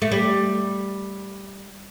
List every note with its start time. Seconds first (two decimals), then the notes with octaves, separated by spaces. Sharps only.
0.02 A3
0.12 G3